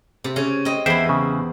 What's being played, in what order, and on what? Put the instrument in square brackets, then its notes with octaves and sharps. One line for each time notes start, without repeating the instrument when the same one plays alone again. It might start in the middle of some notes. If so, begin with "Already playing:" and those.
[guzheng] C3
C#3 C#4
C4 D#5
[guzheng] E2 E4 [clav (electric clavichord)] C5 E5 G5
[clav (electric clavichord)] C#3